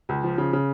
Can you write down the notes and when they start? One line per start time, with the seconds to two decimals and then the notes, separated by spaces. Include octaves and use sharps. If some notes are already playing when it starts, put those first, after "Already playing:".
0.09 C#2
0.23 F3
0.38 C#3
0.53 C#3